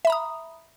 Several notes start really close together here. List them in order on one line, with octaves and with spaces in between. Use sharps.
E5 B5 A#5 D#6